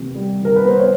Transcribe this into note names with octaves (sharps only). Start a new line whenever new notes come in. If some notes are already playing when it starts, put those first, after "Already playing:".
Already playing: C3 D#3 B3
G3
D#3 A#4
B4
B3 C5
C#5